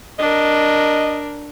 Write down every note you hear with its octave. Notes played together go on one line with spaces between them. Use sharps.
D4 A#4 D#5